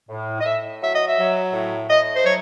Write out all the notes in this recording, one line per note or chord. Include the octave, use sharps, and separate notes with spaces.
A2
D#5
A2 E5
F#3 E5
D#5
E5
F#3
A2
A2 D#5
C5
F#3 C#5